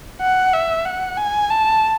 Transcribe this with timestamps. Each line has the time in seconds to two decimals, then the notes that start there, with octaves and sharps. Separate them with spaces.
0.21 F#5
0.54 E5
0.86 F#5
1.17 G#5
1.50 A5